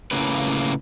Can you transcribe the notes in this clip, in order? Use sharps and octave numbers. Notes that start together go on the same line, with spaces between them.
A2 C#3 A#3 B4